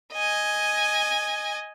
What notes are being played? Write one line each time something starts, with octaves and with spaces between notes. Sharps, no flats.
D#5 G#5